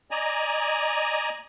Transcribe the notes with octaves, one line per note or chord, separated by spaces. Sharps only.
D5 D#5 G#5 A#5